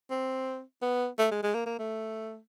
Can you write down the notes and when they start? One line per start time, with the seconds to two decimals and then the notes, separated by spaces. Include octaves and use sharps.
0.11 C4
0.82 B3
1.19 A3
1.31 G#3
1.43 G#3
1.55 A#3
1.66 A#3
1.79 A3